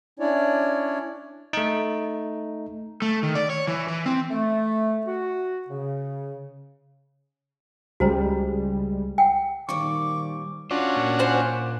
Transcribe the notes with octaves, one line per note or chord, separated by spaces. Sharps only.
C#4 D4 E4 C#5 D5
A3 D#4
A3
D#3
D5
C#5
E3
E3
C4
A3
F#4
C#3
C#2 G3 G#3 F#4 C5 A#5
F#5 G5
A#2 D#3 F3 G3 C#6 D6
C#4 D4 F4 F#4
A#2
C5 F#5 G#5